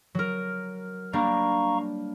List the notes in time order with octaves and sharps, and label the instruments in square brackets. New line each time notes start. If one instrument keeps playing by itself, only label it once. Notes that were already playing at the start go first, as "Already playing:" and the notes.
[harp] F#3 A#4
[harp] G3 A#3 D4 [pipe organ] F5 A#5 C#6